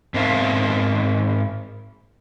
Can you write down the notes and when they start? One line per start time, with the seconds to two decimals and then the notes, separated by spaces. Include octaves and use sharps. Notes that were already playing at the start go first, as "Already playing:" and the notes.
0.14 G#2 C4 A#4 E5 F5 A5